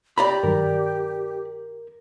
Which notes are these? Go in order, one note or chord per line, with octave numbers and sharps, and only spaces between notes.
G4 D5 A#5 B5
G2 D#3 F#3 A#4